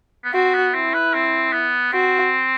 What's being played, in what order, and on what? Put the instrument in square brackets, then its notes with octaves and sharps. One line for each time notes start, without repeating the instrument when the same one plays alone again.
[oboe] B3
[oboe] C4 [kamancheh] F#4
[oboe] B3
[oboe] C4 [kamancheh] E4
[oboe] B4
C4
B3
[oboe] C4 [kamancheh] F#4